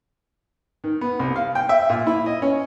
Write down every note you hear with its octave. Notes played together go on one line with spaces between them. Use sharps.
D#3
B3
C2
F5
G5
E5
A#2
E4
D#5
C#4